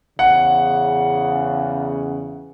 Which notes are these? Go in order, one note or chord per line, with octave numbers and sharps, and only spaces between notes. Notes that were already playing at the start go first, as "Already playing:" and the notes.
E2 C#3 F#5